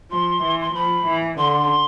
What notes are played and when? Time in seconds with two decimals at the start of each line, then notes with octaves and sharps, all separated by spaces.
0.10 F3 C6
0.42 E3
0.61 C6
0.73 F3 B5
1.05 E3
1.37 D3 C6